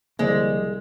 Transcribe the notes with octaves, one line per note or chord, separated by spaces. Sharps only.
C2 D3 F3 G#3 A#3 C5 D5 D#5